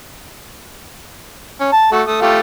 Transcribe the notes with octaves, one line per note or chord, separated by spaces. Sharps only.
C#4
A5
A3 F#4
A3 D#6
A3 F4 G4